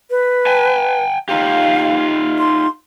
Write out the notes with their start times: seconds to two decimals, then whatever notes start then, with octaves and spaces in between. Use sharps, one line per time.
0.10 B4
0.46 G5 G#5
1.29 D#4 F4 G4 F5
2.38 C6